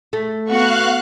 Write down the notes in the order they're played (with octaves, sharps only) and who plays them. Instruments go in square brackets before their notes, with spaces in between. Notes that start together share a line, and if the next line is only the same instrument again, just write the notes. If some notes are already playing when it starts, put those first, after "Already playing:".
[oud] A3
[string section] B3 F#4 C#6 [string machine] F5 F#6